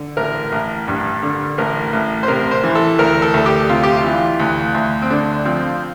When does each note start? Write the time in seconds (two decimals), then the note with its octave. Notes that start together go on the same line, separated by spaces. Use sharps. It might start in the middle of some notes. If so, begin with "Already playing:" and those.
Already playing: D3
0.17 A1 A#4
0.52 A1
0.88 G2
1.23 D3
1.58 A1 A#4
1.93 A1
2.23 C5
2.28 C3 A#4
2.51 C5
2.64 E3
2.75 A4
2.98 D2 A#4
3.22 A4
3.34 D2 A4
3.46 G4
3.69 C3 F4
3.83 G4
3.97 F4
4.04 E3
4.40 D2
4.74 D2
5.02 C4
5.10 D3 D4
5.45 F3 C4